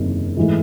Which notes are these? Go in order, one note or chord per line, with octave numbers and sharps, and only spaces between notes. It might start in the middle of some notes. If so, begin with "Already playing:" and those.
Already playing: F#1 E2 C3 D#3 F#3
G#2 E3 A3